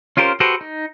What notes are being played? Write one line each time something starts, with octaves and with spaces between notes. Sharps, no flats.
C#4 F4 G4 A#4 C5
F#4 G4 A4 B4 C5
D#4